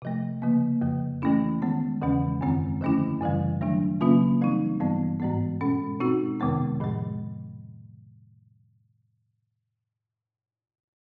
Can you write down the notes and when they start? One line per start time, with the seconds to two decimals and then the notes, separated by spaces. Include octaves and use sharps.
0.02 C3 F3 A3
0.42 C#3 F3 A#3
0.82 F2 C#3 F3
1.22 E3 A3 C#4 E4
1.62 D#3 G#3 B3
2.02 E2 C#3 E3 G#3 C#4
2.41 F#2 D#3 G#3 C4
2.81 D3 F3 A3 C#4 E4
3.21 F#2 C#3 E3 G3
3.61 D#3 F#3 A3 D4
4.01 C#3 F#3 A#3 C#4 F4
4.41 E3 G3 C4 D#4
4.80 G2 E3 G3 B3
5.20 G#2 E3 G#3 B3
5.61 B2 G#3 C#4
6.00 B2 G#3 C4 D#4 F#4
6.40 F2 C3 D#3 G#3 B3
6.80 A2 F3 G#3